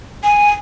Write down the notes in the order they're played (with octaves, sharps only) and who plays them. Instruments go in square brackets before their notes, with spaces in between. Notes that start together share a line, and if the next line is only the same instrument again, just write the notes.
[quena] G#5